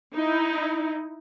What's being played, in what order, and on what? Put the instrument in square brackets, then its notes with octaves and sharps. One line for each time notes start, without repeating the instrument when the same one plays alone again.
[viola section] D#4 E4